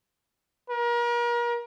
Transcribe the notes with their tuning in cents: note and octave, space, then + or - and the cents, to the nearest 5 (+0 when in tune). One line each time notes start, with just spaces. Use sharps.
A#4 +35